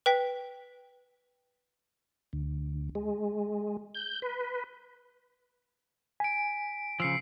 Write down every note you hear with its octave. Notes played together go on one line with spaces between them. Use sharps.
B4 G5 B6
D2
G#3
G6
B4
G#5 B6 D7
C#3 F3 E6 C7 C#7